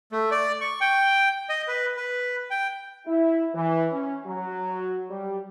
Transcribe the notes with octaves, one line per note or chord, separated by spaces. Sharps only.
A3
D5
C#6
G5
D#5
B4
B4
G5
E4
E3
C#4
F#3
G3